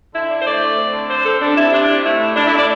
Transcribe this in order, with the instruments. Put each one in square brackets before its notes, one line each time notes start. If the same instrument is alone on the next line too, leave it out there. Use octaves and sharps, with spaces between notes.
[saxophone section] D3 E4
D4
C5
A3 D5
A3
C4
D3
D3 C5
C4 A4
G3 D4
C3 E4
C3 D4
C3
A3 E4
A2
A2 D4
E4
A2
D5